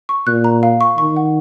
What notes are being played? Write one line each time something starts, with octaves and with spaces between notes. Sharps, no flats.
C#6
A#2 F#6
A#5
F5
C#6
D#3 C#6
F#5